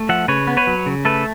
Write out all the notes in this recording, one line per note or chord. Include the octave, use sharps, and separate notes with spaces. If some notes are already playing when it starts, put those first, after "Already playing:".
Already playing: A3
F3 E5 F#5
C#3 B4 C#5
B3
B4 C#5
F#3
C#3
A3 A4 B4